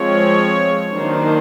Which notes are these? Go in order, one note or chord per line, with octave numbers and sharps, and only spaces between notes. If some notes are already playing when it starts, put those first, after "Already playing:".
Already playing: F3 G#3 C4 C#5
D#3 F#3 A#3 D4 C5